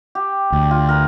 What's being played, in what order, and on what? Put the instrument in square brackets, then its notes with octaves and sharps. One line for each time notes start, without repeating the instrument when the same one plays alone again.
[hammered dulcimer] G4
[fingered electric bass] D2
[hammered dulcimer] F4
A#4 B4